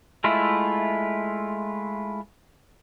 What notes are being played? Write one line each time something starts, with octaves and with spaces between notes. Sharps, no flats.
G#3 A3 E4 F4